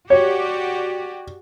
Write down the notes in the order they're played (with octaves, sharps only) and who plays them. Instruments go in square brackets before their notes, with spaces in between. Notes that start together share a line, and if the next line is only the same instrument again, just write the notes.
[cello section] F#4 G4 D5 [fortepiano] C#5